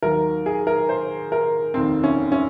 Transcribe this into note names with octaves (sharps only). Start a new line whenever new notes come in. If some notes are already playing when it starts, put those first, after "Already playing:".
D#2 D#3 F#3 A#4
G#4
A#4
C5
A#4
F1 D#2 D#3 C4
C#4
C#4